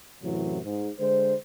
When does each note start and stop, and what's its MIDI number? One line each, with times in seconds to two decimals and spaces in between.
0.23 0.59 42
0.23 0.59 45
0.23 0.59 48
0.23 0.59 52
0.23 0.59 54
0.64 0.91 44
0.99 1.35 50
0.99 1.35 56
0.99 1.35 72